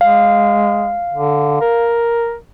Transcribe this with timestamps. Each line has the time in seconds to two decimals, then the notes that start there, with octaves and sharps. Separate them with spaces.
0.01 G#3 F5
1.13 D3
1.61 A#4